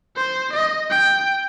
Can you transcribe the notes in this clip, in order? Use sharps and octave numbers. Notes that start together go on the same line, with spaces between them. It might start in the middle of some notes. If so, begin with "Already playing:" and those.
C5
D#5
G5